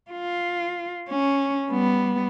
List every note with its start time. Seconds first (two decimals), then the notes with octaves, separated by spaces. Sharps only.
0.11 F4
1.09 C#4
1.70 G3 B3